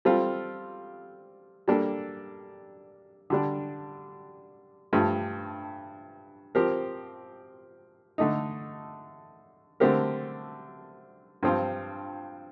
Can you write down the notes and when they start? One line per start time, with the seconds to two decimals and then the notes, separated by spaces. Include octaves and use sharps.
0.05 G3 C4 F4 A4
1.68 G3 A#3 D4 A4
3.30 D3 G3 D4
4.93 G2 F3 A3
6.55 F3 C4 G4 A#4
8.18 D3 A3 D#4
9.80 D3 A3 C4 G4 A#4
11.43 G2 F3 C4 F4